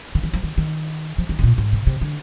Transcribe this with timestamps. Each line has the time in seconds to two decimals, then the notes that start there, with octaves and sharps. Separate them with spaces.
0.15 D3
0.23 D#3
0.33 F3
0.43 D#3
0.58 D#3
1.18 F3
1.29 D#3
1.39 C3
1.43 A#2
1.58 G#2
1.73 C3
1.87 C3
2.01 D3